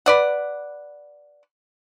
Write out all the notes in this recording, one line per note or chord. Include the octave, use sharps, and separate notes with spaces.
B4 D5 F#5